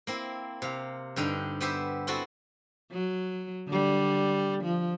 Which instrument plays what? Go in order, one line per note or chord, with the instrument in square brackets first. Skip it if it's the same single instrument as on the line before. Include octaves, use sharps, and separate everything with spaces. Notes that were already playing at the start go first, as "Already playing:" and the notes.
[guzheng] A#3 C4 E4
C3 F5
G2 D3 D#4 G5
B3 G4 C5 E5
B3 C4 E4 F#4 A4
[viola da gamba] F#3
D3 G3
F3